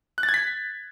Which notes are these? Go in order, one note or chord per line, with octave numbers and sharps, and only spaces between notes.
F#6
A6
G#6
B6